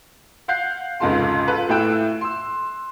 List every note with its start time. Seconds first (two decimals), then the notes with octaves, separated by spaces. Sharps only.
0.48 F5 F#5 F#6 G6 C7
1.00 F1 C#2 G#2 F4 A4 C6
1.48 F4 A4 B4
1.69 A2 A3 E4 G5 E6 F#6
2.21 C6 E6